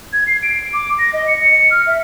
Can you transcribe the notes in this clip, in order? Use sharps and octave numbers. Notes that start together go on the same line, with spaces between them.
G#6
C7
D7
D6
A#6
D#5
C#7
C#7
F6
E5